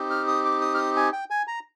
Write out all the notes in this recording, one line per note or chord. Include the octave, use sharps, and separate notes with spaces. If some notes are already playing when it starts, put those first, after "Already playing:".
Already playing: C4 D#4 G4
F6
D#6
D6
D#6
F6
D#6
G#5
G5
G#5
A#5